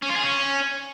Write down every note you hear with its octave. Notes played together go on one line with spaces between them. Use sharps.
C#4
F4
G#4
C#4